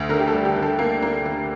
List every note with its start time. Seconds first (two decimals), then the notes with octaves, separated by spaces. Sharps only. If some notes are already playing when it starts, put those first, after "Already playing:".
Already playing: D2
0.09 D3 A#4
0.19 G4
0.28 A4
0.33 G3
0.45 G4
0.56 D3
0.62 A4
0.79 A#3
1.02 A#3
1.26 D3